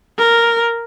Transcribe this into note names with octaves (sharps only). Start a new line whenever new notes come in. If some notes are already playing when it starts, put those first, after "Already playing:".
A#4